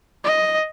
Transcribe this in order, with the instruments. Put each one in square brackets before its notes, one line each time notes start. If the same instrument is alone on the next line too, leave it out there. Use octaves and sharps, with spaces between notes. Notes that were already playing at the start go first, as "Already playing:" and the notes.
[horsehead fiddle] D#5